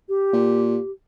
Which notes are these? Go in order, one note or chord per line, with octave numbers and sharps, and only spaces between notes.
G4
A#2